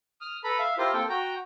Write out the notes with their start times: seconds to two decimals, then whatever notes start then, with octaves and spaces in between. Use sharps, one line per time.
0.21 D#6 F6
0.44 A4 B4 A#5 B5
0.59 E5 F5
0.78 E4 F4 G4 A#4 C5
0.94 A#3 C4 A4 G5
1.09 F#4 G5 A#5